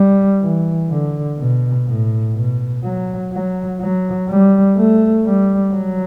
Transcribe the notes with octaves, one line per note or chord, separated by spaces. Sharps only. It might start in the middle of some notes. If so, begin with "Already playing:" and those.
Already playing: G3
E3
D3
B2
A2
B2
F#3
F#3
F#3
G3
A3
G3
F#3